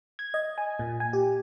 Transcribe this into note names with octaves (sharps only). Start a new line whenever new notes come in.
G#6
D#5
G#5
A#2
G#5
G4